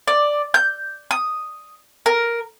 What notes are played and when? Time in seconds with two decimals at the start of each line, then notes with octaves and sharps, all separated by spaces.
0.07 D5
0.54 G6
1.11 D#6
2.06 A#4